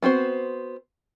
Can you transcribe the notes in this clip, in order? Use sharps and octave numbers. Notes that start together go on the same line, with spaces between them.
B3 C4 F#4 C5